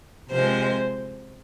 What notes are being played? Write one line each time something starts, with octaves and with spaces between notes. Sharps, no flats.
C3 F3 G#3 C5